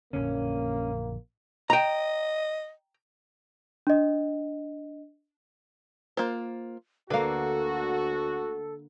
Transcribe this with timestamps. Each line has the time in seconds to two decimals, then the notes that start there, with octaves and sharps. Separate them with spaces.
0.13 A#1 F#2 D3 A#3 C#4
1.70 D#5 G5 A#5
3.87 D4 D#5
6.17 A#3 F4 C5
7.10 D2 D3 A#3 F#4 A4 B4 F5